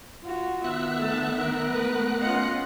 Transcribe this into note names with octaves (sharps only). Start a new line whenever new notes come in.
F4 F#4
D#3 B3 E5 F#6
A3 A5
A#4
A3 B4
C#4 F4 D#5 F5 F#5